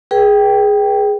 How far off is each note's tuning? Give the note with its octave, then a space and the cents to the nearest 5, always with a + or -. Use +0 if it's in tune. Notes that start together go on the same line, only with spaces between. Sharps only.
G#4 +0 B4 -35 G5 +0